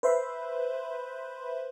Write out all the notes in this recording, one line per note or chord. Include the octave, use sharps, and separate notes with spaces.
B4 C5 E5 B5 C6